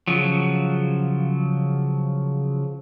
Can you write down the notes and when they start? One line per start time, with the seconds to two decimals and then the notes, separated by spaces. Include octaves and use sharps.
0.08 C#3 F3 F#3